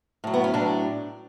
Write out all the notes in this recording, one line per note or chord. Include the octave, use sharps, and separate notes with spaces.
A2 F#3
B3
C#4
A2 F#3 D4